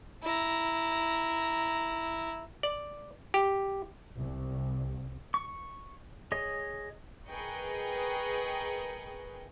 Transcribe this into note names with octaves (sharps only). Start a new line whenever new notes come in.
E4 A#5
D5
G4
C2
C#6
G#4 C#5 D#5
G#4 A#4 B4 D#5 G5 C#6